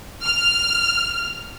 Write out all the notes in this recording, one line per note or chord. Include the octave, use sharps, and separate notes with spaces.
F6